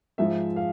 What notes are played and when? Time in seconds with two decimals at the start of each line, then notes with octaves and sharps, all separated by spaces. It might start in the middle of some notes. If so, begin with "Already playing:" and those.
0.18 G#2 F3 G#3 E5
0.56 F5